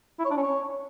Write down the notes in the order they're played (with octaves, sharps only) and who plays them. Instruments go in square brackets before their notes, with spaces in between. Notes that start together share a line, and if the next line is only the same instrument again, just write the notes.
[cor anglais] E4
C#5
D4
C#4
C#5